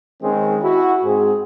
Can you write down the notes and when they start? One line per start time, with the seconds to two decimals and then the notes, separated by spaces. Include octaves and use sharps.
0.22 D#3 G#3 C4 C#4 G#4
0.62 E4 F#4
1.04 G#2 C4 G#4